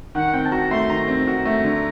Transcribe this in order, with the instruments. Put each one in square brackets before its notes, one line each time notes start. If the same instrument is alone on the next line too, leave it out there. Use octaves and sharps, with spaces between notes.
[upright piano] D#3 [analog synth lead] F#5
[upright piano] C4 [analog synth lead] G5
[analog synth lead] A5
[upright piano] F#4 [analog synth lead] A#5
[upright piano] A3 [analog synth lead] C6
[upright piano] D#3 [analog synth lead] A#5
[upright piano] C4
F#4
A3
D3